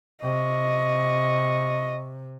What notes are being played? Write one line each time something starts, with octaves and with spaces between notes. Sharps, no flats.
C3 D#5 C#6